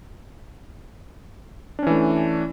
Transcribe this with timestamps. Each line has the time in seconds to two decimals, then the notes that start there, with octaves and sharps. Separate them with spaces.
1.79 D4
1.83 C#4
1.87 E3
1.91 A3